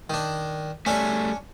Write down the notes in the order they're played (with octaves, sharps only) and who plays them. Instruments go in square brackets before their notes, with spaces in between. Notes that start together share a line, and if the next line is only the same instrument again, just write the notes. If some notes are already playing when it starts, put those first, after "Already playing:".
[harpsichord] D#3 D4
[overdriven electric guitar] G3 A3 [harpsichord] C#4 D4 C#5